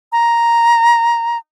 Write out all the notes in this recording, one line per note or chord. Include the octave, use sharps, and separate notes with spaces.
A#5